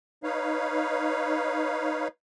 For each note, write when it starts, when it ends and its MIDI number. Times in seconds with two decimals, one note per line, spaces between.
0.23 2.08 63
0.23 2.08 71
0.23 2.08 73
0.23 2.08 77